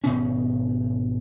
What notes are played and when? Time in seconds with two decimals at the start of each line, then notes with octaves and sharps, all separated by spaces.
0.04 G#1 B2 C#4